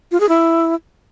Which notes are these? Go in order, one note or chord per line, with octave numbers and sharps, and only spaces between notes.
F4
G#4
E4